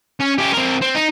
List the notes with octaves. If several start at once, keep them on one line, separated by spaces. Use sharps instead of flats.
C#4
C#4 G4
C4 A#4
C4
D#4